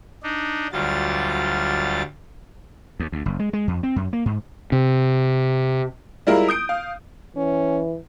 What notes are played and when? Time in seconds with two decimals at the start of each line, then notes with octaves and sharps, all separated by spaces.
0.23 D4 D#4
0.72 D2 F#3 G3 F4 A6
3.00 D#2
3.12 D2
3.26 F#1
3.39 G#3
3.53 G#3
3.68 F2
3.83 C4
3.96 F#2
4.13 A#3
4.26 G#2
4.72 C3
6.27 G3 G#3 E4 F4 A#4
6.48 D#6 G6 D7
6.69 F5
7.36 E3 C#4